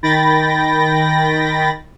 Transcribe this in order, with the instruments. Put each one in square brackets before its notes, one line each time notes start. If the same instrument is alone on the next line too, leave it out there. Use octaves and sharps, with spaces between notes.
[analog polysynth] D#3 G5 B5 A6 A#6